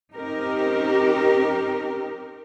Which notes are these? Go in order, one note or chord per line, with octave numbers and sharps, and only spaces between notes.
C4 C#4 D#4 G4 A#4